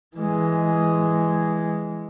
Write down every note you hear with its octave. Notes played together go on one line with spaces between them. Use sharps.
E3 G#3